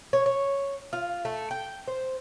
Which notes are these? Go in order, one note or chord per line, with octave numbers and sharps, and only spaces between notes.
C#5
C#5
F4
A3
G5
C5